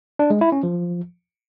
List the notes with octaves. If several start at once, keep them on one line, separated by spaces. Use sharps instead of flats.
D4
G#3
E4
C#4
F3